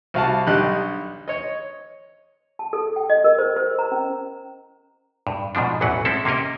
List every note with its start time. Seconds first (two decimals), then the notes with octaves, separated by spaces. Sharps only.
0.14 C2 F#4 F5 F#5 A5
0.47 B1 D3 G4 D#5 F#6
1.28 C#5 D#5
2.59 A5
2.73 A4
2.96 G5
3.10 D#5
3.24 A#4
3.39 C5
3.56 C5
3.79 A#5
3.92 C#4
5.27 G2
5.55 G#2 B2 F3 D4
5.81 A1 E2 E3 F#3 B4 F#5
6.05 G#3 C4 C#4 E4 A4
6.25 C3 A#3 C#4 A#4 D#5